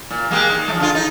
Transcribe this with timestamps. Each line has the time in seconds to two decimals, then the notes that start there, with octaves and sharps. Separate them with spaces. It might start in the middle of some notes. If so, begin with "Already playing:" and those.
0.11 A#2
0.31 G#3 A#3 G4
0.51 D#3
0.68 F3 A3
0.80 D3 F4
0.95 D#4